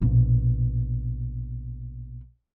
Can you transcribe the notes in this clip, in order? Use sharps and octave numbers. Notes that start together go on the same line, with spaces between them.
A#1 B2